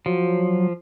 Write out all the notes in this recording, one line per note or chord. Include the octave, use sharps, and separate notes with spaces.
F3 F#3